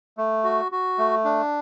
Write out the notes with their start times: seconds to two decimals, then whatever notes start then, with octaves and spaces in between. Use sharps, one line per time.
0.17 A3
0.44 F#4
0.72 F#4
0.98 A3
1.24 D4